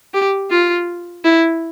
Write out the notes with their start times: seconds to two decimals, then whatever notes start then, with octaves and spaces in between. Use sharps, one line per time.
0.13 G4
0.50 F4
1.24 E4